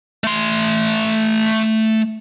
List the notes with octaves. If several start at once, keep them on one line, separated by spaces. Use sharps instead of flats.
A3 C6